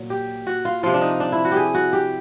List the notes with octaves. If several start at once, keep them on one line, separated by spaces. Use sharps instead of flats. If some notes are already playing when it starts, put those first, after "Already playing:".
Already playing: A#2 F#3
G4
F#4
F4
C3 F3 F4
D4
D#4
D4
E4
F#4
G4 G#4
F#4
G4